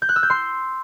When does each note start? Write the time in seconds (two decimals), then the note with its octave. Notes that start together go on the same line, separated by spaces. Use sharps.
0.02 G6
0.09 F#6
0.16 E6
0.23 G6
0.30 C6